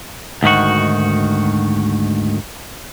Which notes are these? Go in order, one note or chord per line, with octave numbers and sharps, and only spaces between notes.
D2 G#2 D#3 F#4